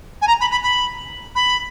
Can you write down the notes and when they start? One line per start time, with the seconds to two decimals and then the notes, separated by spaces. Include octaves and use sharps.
0.22 G#5
0.28 A#5
0.41 B5
0.51 B5
0.63 B5
1.35 B5